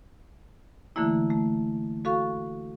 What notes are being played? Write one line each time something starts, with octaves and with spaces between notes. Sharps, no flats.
D3 E3 A3 A#3 E4
A3
F#4 A4 F5 C#6